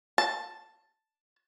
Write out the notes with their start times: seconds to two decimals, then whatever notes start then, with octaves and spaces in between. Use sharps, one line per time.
0.18 A5